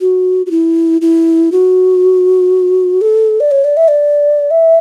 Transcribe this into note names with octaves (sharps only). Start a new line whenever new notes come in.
F#4
F#4
E4
E4
F#4
A4
D5
C#5
D5
E5
D5
E5